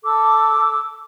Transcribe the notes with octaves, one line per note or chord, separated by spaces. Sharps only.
A4 D6 E6